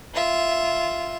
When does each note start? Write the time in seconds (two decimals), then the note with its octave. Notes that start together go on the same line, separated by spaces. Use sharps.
0.14 F4 E5